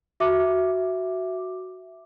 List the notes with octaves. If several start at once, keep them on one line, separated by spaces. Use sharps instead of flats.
F#4 E5 D6